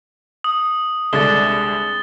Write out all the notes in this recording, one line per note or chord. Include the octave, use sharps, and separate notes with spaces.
D#6
C2 D3 G#3 A6 G7